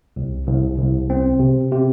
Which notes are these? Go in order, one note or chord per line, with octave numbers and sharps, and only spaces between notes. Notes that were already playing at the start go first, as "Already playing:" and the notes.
C2
C2
C2
C4
C3
C3